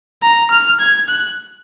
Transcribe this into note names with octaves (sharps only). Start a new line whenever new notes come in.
A#5
F6
G#6
F#6